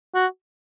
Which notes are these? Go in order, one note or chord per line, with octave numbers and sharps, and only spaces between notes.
F#4